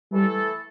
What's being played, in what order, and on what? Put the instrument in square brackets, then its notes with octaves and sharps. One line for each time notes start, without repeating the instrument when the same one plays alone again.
[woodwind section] E3 A3 E4 A4 [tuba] G3